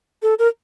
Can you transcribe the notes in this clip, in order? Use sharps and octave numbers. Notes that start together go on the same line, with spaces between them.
A4
A#4